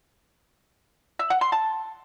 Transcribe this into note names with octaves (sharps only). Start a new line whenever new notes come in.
E5
F#5
C6
A5